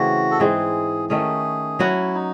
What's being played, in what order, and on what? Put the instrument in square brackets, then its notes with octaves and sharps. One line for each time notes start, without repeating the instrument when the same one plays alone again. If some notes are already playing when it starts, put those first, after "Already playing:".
Already playing: [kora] C#3 E3 A3 C4 [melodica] F#4
[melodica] A4
[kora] G#2 E3 G#3 C4 [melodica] G#4
[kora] D#3 A3 C#4 [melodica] G#4
[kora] F#3 C#4 F#4 [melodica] E4
[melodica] D#4